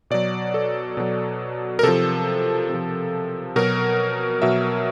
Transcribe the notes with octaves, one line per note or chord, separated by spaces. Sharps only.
B2 F#3 D5
A4
B2 F#3
A#4
C3 F3 A4
C3 F3
B2 F#3 A#4
B2 F#3 E5